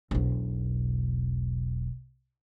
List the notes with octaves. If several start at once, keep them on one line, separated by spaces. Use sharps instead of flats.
E1 B1